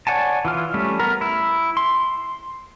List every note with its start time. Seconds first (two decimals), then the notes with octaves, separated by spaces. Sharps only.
0.07 C#5 D5 F#5 G#5 A5
0.45 E3 F4 F6
0.74 G3 A3 C#4
0.99 B3 A#4 A#5
1.21 E4
1.77 C6